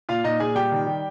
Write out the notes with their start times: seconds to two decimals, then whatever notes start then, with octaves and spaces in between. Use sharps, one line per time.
0.09 A#2 F4 F5
0.24 A#2 D#4 D#5
0.40 A#2 G#4 G#5
0.55 G3 G4 G5
0.72 D#3
0.86 G3